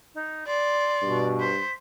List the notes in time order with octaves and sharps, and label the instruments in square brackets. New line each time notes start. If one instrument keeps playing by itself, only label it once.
[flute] D#4
[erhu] D5 [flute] C6
[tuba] G2 [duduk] B2
[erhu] C5 [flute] B6